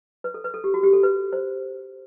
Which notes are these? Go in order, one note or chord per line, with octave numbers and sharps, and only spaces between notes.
B4
A4
B4
A4
G4
F#4
G4
A4
B4
C5